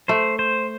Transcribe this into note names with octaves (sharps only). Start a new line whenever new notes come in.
A3 C5
C5